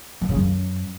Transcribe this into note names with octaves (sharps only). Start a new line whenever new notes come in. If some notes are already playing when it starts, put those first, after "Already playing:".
E3
C#3
F#2